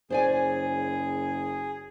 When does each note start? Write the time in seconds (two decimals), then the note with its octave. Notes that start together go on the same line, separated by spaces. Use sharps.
0.10 F#1 G#4 C5 D5 G#5